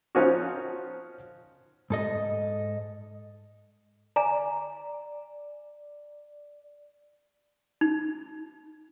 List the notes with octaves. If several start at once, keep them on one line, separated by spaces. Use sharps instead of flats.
F3 C4 C#4 D#4 F4 F#4
G#2 A4 D#5
D5 G#5 A#5
D#4